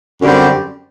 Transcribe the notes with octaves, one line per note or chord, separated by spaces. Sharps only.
F#2 D3 G3 C4